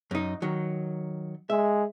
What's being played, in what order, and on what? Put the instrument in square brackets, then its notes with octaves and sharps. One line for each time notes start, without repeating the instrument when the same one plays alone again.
[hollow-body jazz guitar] F#2 D#4
D#3 F#3
[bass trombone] G#3 [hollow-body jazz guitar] E5